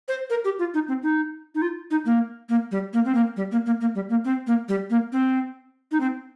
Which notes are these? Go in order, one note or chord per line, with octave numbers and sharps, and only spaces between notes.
C5
A#4
G4
F4
D#4
C4
D#4
D#4
F4
D#4
A#3
A#3
G3
A#3
C4
A#3
G3
A#3
A#3
A#3
G3
A#3
C4
A#3
G3
A#3
C4
D#4
C4